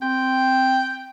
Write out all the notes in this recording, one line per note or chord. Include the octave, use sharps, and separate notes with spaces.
C4 G5